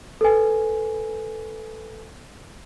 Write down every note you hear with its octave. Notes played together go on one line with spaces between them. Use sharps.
A4 B4 G#5